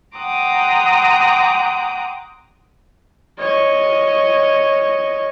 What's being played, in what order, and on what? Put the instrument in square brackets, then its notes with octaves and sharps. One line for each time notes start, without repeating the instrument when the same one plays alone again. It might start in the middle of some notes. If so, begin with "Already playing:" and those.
[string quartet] F#5 G5 A#5 C6 D6 D#6
[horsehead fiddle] C#5 D#5